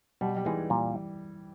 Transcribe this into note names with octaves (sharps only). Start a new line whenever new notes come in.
B2 G3
G3
E3 G#3 B3 D#4 G#4
A#2 G3